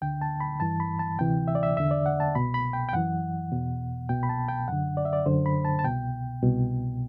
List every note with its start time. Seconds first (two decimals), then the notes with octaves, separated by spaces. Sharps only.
0.02 D2 D3 G5
0.22 A5
0.40 B5
0.60 G2 E3 A5
0.80 B5
0.99 A5
1.19 D2 C3 E3 G5
1.48 E5
1.55 D5
1.63 E5
1.77 E2 D3 E5
1.91 D5
2.06 F#5
2.20 A5
2.35 C2 B2 B5
2.54 B5
2.73 G5
2.89 G5
2.93 F#2 E3 F#5
3.52 E2 B2
4.09 C2 B2 G5
4.23 B5
4.29 A5
4.48 G5
4.68 F#2 D3 F#5
4.97 D5
5.05 E5
5.13 D5
5.26 F#2 D3 C5
5.46 B5
5.65 A5
5.79 A5
5.84 C2 B2 G5
6.43 C2 B2